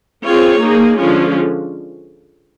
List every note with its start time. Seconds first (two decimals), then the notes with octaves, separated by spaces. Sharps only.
0.24 C4 F4 G#4 C#5
0.61 A#3 D#4 G#4
0.98 D3 F3 G#3 C#4 F4